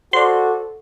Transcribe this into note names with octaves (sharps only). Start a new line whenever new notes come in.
F#4 A4 C5 D5 C6